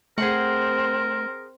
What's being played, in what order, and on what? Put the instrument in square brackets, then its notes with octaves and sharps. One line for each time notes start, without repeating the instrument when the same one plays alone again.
[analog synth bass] A3 [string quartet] C4 [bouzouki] G#4 C5 F#5 [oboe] A#4